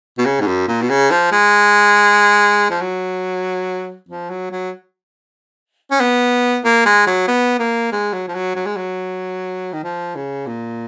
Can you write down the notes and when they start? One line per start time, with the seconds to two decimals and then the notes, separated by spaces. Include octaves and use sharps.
0.18 B2
0.26 C#3
0.41 G#2
0.47 F#2
0.68 A#2
0.82 B2
0.90 C#3
1.11 F3
1.32 G#3
2.70 F3
2.81 F#3
4.09 F3
4.30 F#3
4.51 F#3
5.91 C#4
6.00 B3
6.64 A#3
6.86 G#3
7.07 F#3
7.28 B3
7.59 A#3
7.92 G#3
8.13 F#3
8.28 F3
8.35 F#3
8.56 F#3
8.66 G#3
8.77 F#3
9.73 D#3
9.84 F3
10.15 C#3
10.47 A#2